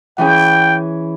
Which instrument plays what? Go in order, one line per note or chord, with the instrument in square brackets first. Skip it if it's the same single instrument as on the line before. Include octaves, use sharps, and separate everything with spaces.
[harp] E3 C#4 G#4 [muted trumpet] G5